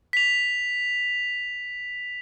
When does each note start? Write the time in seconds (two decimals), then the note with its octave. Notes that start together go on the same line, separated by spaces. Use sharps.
0.13 B6 F7